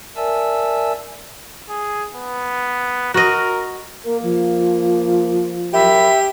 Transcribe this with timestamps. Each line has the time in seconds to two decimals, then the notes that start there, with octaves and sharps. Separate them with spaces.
0.16 A#4 D5 E5 G#5 A5 E6
1.69 G#4
2.14 B3
3.14 F#4 A#4 D#5
4.05 A#3 A#4
4.23 F3
5.73 F#2 F#3 G4 E5 B5